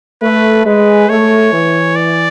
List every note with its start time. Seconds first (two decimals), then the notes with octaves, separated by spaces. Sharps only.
0.22 A3 B4
0.65 G#3 B4
1.09 A3 C#5
1.52 E3
1.96 D5